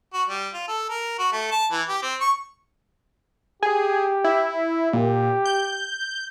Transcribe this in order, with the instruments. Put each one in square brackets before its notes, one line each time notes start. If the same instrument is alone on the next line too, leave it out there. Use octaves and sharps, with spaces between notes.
[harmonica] F#4
G3
F4
A4
A#4
F#4
A3
A5
E3
G4
C4
C#6
[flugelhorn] G4 [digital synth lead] G#4
[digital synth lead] E4
[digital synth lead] A#2 [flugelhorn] G4
[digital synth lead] G6